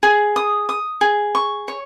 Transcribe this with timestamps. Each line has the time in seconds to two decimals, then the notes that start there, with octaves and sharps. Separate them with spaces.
0.03 G#4
0.36 D#6
0.69 D#6
1.01 G#4
1.35 C#6
1.68 C#5